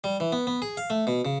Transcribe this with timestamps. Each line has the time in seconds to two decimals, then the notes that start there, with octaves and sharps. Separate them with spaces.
0.04 G3
0.20 E3
0.32 B3
0.47 B3
0.62 G#4
0.77 F5
0.90 A3
1.07 B2
1.25 C#3